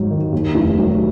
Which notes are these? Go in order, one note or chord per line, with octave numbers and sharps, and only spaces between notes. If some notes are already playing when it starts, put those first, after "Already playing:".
Already playing: G#1 G#2 F#3
D#3
D#2
F1
F#3